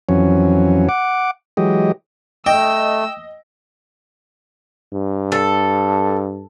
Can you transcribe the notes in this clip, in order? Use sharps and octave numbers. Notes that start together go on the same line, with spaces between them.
F2 E3 F#3 C#4
F#5 D6
E3 F#3 G#3 G4 D#5
A3 D#5 G5 E6
G2
A4